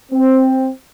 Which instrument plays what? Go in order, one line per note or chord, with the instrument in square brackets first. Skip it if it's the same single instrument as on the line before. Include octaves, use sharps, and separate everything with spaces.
[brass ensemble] C4